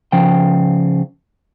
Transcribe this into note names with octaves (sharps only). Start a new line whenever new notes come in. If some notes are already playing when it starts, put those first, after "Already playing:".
C#3 F3 G5